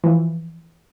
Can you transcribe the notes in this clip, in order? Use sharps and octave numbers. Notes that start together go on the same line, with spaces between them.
E3 F3